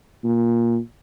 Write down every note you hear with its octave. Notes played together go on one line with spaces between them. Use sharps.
A#2